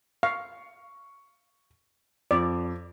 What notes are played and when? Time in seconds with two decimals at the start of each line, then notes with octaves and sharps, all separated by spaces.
0.23 F5 C#6
2.31 F2 D5